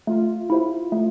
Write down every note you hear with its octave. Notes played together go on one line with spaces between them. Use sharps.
A3 F4
E4 G4 C5 E5
A3